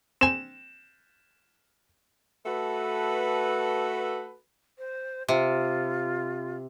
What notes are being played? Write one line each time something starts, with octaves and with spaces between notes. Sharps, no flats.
C4 G#5 E7
A3 F#4 A4 B4
C5
C3 F4